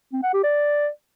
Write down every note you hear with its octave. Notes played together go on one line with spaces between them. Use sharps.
C4
F#5
G4
D5